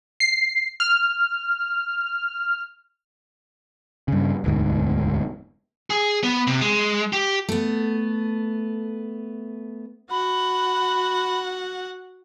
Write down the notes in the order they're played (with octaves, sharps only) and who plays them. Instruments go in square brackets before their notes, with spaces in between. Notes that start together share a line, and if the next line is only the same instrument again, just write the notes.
[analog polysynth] C7
F6
[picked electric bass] G2 C#3
E1 D2 G#2
[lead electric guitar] G#4
B3
C3
G#3
G4
[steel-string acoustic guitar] A3 B3
[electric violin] F#4 F#5 [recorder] B5